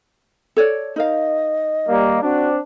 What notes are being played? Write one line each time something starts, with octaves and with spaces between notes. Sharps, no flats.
A4 C#5 D5
D#4 A#4 D#5 F5
G3 A#3
C4 D4 F#4